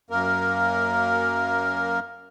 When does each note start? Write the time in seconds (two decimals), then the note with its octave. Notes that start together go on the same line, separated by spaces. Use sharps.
0.10 F#2 A#3 A#4